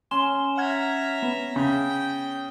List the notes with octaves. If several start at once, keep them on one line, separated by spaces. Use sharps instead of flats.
C#4 C6 E7 G7
E5 F#5 A#5 F6 G#6
B3
C#3 G5